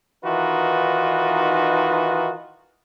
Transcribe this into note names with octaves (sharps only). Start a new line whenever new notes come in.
D#3 E3 D#4 F4 F#4 B4